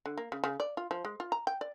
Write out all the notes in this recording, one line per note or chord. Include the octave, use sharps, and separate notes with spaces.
D3
A#3
C#3
C#3
D5
F4
F3
G#3
F4
A#5
G5
D5